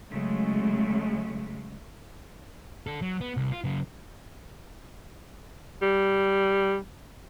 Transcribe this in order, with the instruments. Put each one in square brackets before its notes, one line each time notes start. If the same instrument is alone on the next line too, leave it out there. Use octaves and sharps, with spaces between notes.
[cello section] C#3 F#3 G#3 A3
[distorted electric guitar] D4 A4
F#3
B3
C2
F4
C#3 F#3
[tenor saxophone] G3